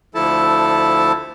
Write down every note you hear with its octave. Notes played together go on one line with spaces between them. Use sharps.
D2 F3 E4 A4 A5